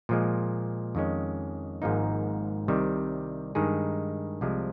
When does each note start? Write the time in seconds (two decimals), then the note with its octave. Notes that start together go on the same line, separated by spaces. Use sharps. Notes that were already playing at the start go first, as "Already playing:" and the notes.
0.09 A#2 F3 G#3
0.95 F2 D#3 G#3 C#4
1.82 G#1 G#2 F3 A#3 D#4
2.68 C2 C3 D#3 G3
3.55 G2 D#3 G#3 D#4 G#4
4.41 C2 C3 F3 G#3